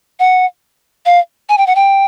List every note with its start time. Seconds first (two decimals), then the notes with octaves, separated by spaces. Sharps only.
0.20 F#5
1.06 F5
1.49 G#5
1.58 G5
1.67 F#5
1.76 G5